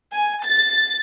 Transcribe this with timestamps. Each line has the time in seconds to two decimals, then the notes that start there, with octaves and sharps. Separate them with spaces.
0.13 G#5
0.44 A6